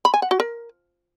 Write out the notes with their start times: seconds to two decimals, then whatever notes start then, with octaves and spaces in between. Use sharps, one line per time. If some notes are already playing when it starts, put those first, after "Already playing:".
0.05 B5
0.14 G#5
0.22 F#5
0.31 F#4
0.40 A#4